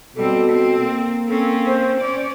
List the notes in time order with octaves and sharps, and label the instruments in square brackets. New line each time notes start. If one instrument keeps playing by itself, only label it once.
[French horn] B2 [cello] G3 C4 [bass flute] A4
[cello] C4
[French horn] A#3
[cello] C4 C#4 [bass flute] A4
[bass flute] C5
[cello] C#4 D5